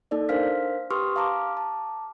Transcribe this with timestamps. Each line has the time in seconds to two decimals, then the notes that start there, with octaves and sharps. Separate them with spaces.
0.11 A#3 D#4 A4 D5
0.29 D4 A#4 C5 F5 F6 B6
0.91 G4 B4 C6 C#6 D#6 F6
1.16 F5 A5 A#5 D6 F6
1.57 A5 A#5 D6